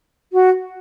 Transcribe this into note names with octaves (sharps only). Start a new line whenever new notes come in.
F#4